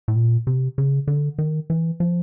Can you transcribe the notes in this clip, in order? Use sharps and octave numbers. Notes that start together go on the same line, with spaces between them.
A2
A#2
C3
C#3
D3
D#3
E3
F3